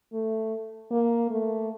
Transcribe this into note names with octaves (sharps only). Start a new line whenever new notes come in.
A3
A#3
A3